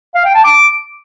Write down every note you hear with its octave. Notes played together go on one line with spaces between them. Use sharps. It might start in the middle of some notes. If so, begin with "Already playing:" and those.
F5
G5
A5
D6